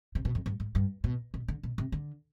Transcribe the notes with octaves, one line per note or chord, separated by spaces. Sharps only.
C3
B2
F2
G2
G#2
G2
B2
B2
D3
B2
C3
D3